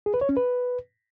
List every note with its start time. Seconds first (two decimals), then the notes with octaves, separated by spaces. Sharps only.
0.06 G#4
0.14 B4
0.21 C#5
0.29 C#4
0.37 B4